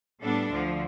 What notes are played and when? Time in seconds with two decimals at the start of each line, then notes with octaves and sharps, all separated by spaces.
0.22 A2 G3 B3 D4 A4
0.50 D2 D3 F3